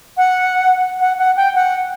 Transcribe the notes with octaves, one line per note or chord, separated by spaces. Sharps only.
F#5
F#5
F#5
G5
F#5